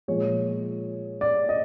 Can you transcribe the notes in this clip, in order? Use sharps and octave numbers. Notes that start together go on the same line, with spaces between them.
A#2 F3 G#3 C#5
D5
D#5